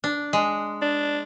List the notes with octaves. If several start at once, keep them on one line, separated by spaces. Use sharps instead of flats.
D4
G#3
D4